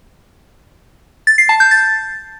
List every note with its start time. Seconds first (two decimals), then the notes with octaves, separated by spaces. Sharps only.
1.27 A6
1.38 C7
1.49 A5
1.60 G6
1.71 A6